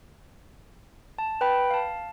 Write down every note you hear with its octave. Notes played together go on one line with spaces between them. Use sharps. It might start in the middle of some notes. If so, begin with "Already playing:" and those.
A5
B4 G5 B5
F5 A5